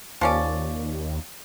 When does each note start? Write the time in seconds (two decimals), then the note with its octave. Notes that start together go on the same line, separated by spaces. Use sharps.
0.21 D#2 F3 C#4 D5